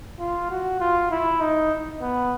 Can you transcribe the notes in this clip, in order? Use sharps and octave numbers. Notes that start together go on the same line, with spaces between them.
F4
F#4
F4
E4
D#4
B3